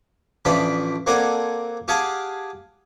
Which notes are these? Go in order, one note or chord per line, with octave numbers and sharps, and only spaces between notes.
A1 E3 F3 D4 G5 B5
A#3 C4 A4 D5 F#5 G#5
G4 G#4 F5 F#5 G#5 A5